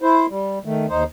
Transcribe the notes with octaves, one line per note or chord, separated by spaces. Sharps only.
E4 C5
G3
D#3 A3
D#2 D#4 C5